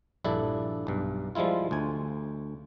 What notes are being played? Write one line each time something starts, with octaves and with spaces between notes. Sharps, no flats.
A#1 G2 D4 E4 A4
B1 G2
F3 G3 G#3 E4 F4
D2 G#5